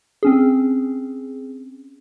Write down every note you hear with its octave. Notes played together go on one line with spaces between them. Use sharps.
C4 C#4 G#4